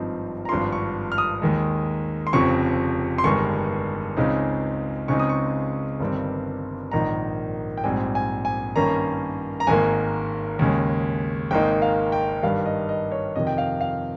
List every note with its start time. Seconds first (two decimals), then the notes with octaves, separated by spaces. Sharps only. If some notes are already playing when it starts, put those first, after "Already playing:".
Already playing: G#1 G2 F3 C4 D#4
0.45 A#5
0.49 G#1 G2 F3 C6
0.72 C#6
1.12 F6
1.18 D#6
1.42 D#2 D#3 G#3
2.27 C6
2.33 F1 F2 C#3 F3 C4 C#6
3.18 C6
3.24 G1 G2 D#3 G#3 C#6
4.17 C#2 C#3 G#3 C4 D#4
5.08 C#2 C#3 G#3 C4 D#4 C#6
5.20 D#6
5.29 C#6
6.00 G1 G2 D#3 G3 C4
6.91 A#1 G#2 D#3 A#3 D#4 A#5
7.78 G5
7.84 A#1 G#2 G3 C4 G#5
8.15 G#5
8.45 G#5
8.76 G2 D#3 A#3 C#4 A#5
9.60 A#5
9.67 G#1 G#2 D#3 A#3 G#5
10.59 D#2 C#3 G#3
11.51 G#1 G#2 D#3 A#3 D#4 G5
11.82 F5
12.12 G5
12.43 G2 D#3 G3 F5
12.66 D#5
12.89 D#5
13.12 C#5
13.35 F2 C3 D#3 D#5
13.47 G5
13.58 F5
13.81 F5